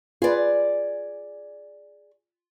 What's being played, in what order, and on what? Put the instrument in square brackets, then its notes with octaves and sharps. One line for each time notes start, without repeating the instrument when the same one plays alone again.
[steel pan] F4 B4 [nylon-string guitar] G#4 D5